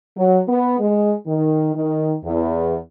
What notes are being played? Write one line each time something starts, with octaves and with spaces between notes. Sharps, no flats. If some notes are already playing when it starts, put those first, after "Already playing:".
F#3
B3
G#3
D#3
D#3
E2